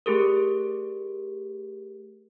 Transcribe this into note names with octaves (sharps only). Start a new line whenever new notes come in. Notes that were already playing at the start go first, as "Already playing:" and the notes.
A3 G4 G#4 A#4